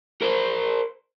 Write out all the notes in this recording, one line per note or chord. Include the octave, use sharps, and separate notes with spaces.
A#4 C5